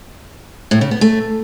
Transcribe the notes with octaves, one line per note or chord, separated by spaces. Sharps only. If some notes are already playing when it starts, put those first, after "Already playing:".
A2
C#3
B3
A3